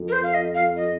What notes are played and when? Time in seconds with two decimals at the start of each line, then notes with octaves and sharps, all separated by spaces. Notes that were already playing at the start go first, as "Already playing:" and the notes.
Already playing: F2
0.08 A#4
0.12 C5
0.23 F5
0.34 D#5
0.55 F5
0.76 D#5